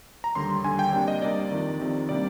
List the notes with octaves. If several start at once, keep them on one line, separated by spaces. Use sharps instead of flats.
A#5
D#2 D3 G3 C6
D#2 D3 G3 G#5
G5
C3 G3 A#3 D4 G5
D#5
C3 G3 A#3 D4 D5
F2 C3 D#3
F2 C3 D#3
C3 G3 A#3 D4 D5